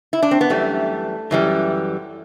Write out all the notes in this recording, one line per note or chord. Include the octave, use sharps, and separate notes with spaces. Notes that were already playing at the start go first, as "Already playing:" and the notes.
E4
D4
C4
B3
F#2 E3 G3 A3
F#2 E3 G3